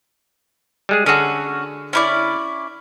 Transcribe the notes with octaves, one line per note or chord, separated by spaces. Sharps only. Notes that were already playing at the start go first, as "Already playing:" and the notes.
G3 G#3 G#4
D3 C#4 F#4 G#4 A4
C#4 E4 D5